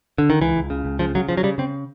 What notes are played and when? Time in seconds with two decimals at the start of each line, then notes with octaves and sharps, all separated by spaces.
0.18 D3
0.30 D#3
0.41 C#2 E3
0.56 C#2
0.70 C#3
0.85 C#2
0.99 C#3 F3
1.15 C#3 F#3
1.29 C#3 F3
1.37 F#3
1.43 C#3 G3
1.58 C#3 C4